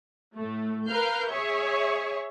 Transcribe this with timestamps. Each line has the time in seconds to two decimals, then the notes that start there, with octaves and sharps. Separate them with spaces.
0.36 A2 A3
0.88 A#4 B4 F5 F6 G6
1.29 G#4 C#5 E5 C#6